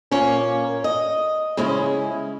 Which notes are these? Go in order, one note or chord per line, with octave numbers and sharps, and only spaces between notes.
A#2 A#3 C#4 C#5
D#5
C#3 G#3 C#4 E4